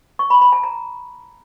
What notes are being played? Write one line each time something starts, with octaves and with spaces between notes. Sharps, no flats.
C#6
B5
B5
A5
A#5